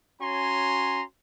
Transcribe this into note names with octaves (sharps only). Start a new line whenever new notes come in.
C#4 F#4 C#5 G#5 A#5 C6